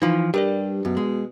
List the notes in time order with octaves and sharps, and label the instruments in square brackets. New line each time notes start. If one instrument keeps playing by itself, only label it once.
[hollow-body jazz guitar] E3 F3 [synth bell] D#4
[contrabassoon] G2 [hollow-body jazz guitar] G3 [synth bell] G4 A#4 D5
[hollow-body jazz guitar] F#2 [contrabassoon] B2
[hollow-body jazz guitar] G#3